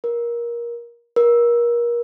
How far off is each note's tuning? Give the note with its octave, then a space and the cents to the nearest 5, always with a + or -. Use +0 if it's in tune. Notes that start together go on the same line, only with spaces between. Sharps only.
A#4 +20
A#4 +30